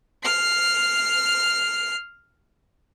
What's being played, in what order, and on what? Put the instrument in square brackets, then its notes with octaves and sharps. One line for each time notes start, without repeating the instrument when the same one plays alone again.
[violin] F6 C7